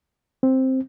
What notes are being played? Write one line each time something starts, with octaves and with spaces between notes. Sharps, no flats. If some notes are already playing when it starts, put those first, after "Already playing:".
C4